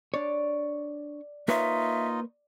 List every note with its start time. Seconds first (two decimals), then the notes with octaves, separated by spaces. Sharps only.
0.14 D4 C#5 D5
1.48 A#3 D#4 F4 B4 C#5 D#5 E5